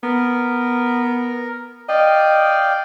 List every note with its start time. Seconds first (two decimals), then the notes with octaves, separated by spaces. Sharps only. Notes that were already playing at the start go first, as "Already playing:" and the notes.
0.03 B3 A#4
1.89 D5 D#5 F5 G5